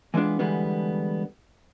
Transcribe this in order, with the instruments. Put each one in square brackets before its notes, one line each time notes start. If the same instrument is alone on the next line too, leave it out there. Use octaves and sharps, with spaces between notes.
[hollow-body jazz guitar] E3 G#3 A#3 B3 D4 F4
D3 E3 G3 G#3 B3